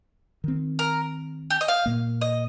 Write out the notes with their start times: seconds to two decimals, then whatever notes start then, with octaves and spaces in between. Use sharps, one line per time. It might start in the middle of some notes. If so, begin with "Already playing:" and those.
0.44 D#3 C4
0.79 A#4
1.51 G4
1.61 D#5
1.68 F5
1.86 A#2 A#3
2.21 D#5